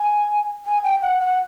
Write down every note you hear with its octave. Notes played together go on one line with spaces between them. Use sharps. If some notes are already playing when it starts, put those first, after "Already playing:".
Already playing: G#5
G#5
G5
F#5
F#5